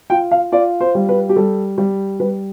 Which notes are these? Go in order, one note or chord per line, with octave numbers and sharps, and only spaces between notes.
F4 G5
F5
F4 D5
C5
G3
B4
G4
G3 A4
G3
G3 B4